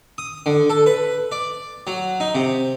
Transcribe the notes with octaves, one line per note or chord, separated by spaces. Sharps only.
D#6
D3
A4
B4
D5
F#3
D#4
C3